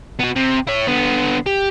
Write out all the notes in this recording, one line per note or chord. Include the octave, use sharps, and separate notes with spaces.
B3 F#4
C3
E4 C#5
D3 B3
G4